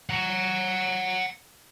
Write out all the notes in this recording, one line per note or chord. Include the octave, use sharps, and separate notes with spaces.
F#5 A#5